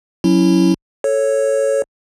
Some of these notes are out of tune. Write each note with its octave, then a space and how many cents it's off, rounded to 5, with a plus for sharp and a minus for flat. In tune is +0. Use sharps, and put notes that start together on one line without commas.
F#3 -15 C#4 +0 E4 +0
A4 +0 C#5 -5